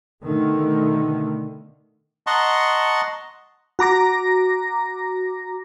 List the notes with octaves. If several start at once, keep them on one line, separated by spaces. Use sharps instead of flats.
B2 D3 D#3 A3
D#5 F#5 A5 A#5 C6 C#6
F#4 A#5 D6 A#6